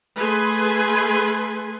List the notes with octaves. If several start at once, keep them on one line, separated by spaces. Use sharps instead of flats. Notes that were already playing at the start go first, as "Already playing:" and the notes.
A3 G#4 B4 G#5 C6